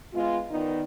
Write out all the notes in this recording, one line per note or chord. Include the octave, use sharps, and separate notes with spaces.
G#3 B3 F4
D#3 B3 D#4 A#4 D5